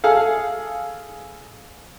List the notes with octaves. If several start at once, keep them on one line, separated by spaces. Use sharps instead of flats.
G#4 A4 F5